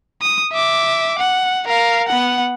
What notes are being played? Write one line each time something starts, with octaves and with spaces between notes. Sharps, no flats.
D#6
E5 D6
F#5
A#4 F5
B3 F#5